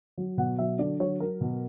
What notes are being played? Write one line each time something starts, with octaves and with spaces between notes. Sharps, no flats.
F#3
B2 F#5
F#3 E5
D3 D5
F#3 C#5
F#3 A#4
B2